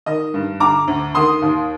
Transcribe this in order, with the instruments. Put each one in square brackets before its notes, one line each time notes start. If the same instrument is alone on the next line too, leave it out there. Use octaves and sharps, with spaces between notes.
[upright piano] D#3 D#5
G2
D3 A#5 D6
D2
D#3 C6 D#6
D#2